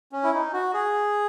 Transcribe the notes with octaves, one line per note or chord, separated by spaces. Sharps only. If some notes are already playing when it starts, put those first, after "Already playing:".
C#4
E4
D#4
F#4
G#4